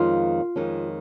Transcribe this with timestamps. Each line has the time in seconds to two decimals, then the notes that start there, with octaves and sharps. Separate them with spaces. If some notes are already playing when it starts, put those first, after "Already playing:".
Already playing: F2 D#3 G#3 C#4 F4
0.56 F2 D#3 G#3 C#4